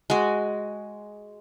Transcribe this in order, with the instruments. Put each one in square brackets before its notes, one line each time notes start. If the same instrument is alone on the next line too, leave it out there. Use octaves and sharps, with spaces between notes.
[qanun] G#3 F#4